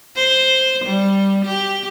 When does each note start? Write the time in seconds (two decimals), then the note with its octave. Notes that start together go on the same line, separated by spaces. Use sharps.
0.16 C5
0.85 G3
1.45 G4